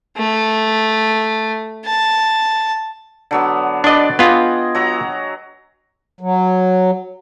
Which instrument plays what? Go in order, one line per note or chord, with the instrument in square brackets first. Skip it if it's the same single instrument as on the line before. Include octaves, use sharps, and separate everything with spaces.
[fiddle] A3
A5
[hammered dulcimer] D3 F#3 B3
[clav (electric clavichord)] D4 D#5 [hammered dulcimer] B4 D5 C6
[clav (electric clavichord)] B3 F4 [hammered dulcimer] G#4 D#5 G5
[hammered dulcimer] F#3 A#5
[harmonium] F#3